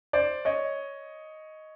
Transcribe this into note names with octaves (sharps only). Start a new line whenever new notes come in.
C5 D5
C#5 D#5